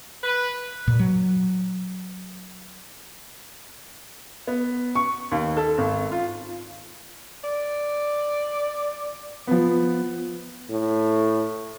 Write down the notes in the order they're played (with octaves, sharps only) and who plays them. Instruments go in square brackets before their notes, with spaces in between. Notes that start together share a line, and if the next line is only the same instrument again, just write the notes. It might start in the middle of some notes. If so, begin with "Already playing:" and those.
[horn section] B4
[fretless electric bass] A#2
F#3
[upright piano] B3
C#6
D#2
A4
G#1
F4
[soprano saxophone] D5
[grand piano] F3 B3
[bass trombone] A2